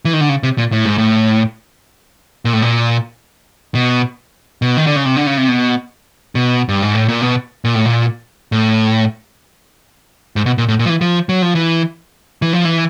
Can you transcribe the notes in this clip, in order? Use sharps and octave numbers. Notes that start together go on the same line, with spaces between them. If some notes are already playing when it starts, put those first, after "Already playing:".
E3
D#3
D3
C#3
C3
A#2
A2
G#2
A2
A#2
A2
A#2
B2
B2
D#3
D3
C#3
C3
D3
C#3
C3
B2
B2
G2
G#2
A2
A#2
B2
A#2
A2
A#2
A2
G#2
B2
A#2
A2
A#2
F3
E3
F3
F#3
F3
E3
E3
F3
E3